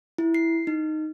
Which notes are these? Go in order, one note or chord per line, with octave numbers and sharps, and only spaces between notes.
E4
C7
D#4